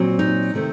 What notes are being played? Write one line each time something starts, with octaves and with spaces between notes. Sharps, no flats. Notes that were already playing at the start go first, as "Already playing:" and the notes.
Already playing: A#2 F#3 C4
D#4
C3 D#3 A3 C4